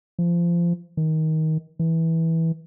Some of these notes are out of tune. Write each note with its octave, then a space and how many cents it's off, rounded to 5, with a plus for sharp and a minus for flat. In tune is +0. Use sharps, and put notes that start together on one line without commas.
F3 -25
D#3 +20
E3 -15